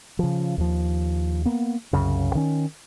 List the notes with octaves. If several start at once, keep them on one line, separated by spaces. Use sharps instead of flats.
C#3 F3
D#2 F3
A#3 B3
C2 F#2 C#3
D#3 C#4